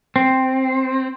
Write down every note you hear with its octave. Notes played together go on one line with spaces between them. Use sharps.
C4